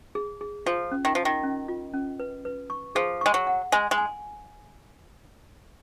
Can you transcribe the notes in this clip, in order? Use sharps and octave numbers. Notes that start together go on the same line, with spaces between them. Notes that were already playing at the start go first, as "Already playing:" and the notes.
G#4
G#4
F3 F4
C#4
D#3
F3 F4
D#3
C#4
F4
C#4
B4
B4
C#6
F3 G#4
G#3 C#6
F#3
F#5
G#3 G#5
G#3
G#5